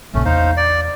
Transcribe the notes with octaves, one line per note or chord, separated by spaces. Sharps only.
A#1 C#3 A3 C#4
E2 D#4 C5 F5
D5